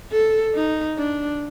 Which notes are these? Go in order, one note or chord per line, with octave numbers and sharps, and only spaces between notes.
A4
D#4
D4